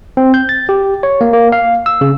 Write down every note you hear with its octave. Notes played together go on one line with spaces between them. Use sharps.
C4
G6
A6
G4
C#5
A#3
A#3
F5
E6
C#3